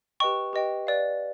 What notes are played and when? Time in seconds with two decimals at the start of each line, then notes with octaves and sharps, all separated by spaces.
0.20 G4 B4 D#5 G5 C#6
0.53 G4 B4 D#5 G5
0.87 B4 D5 F5